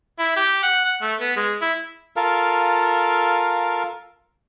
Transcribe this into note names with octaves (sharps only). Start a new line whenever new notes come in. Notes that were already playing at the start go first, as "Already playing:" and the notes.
E4
G4
F#5
F#5
A3
B3
G#3
E4
F4 A4 A#4 F5